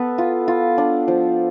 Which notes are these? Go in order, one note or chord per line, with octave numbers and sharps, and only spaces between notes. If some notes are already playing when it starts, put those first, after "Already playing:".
Already playing: B3 A4 B4
F4
F4
D4
F3